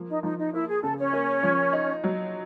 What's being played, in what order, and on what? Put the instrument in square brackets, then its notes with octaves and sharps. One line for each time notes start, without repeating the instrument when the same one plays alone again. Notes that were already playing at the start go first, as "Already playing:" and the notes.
Already playing: [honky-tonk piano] F3 A#3
[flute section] D#4
[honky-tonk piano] F3 [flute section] D#4
[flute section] D#4
[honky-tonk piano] A#3 [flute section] E4
[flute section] G#4
[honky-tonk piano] C#3 [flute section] A4
[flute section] C#4 C#5
[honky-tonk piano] A#3
F3
D#4
F#3